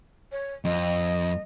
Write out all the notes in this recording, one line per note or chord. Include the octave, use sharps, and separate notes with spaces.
C#5
F2 D#5